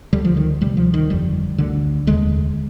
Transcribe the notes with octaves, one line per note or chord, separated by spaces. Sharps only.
D2 D3 G3
F3
D#3
D2 C3 G3
F3
D#3
G1 F2 D3 G3
D2 D3
F1 D#2 D3 G#3